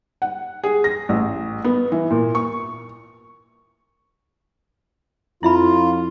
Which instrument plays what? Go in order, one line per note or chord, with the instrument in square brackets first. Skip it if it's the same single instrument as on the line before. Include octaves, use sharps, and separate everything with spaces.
[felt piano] F#5
G#4
A#6
A1
B3
E3
A#2
C#6
[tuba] F2 [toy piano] E4 E5 B5 [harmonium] F4